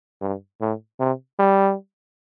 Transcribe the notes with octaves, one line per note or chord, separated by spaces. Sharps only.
G2
A2
C3
G3